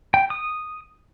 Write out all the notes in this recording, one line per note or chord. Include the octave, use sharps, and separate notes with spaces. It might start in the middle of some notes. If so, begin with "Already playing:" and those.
G5
D#6